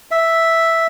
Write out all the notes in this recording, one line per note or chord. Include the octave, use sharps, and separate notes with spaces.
E5